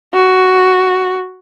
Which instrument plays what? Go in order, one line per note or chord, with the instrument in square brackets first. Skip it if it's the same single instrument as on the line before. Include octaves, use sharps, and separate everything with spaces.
[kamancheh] F#4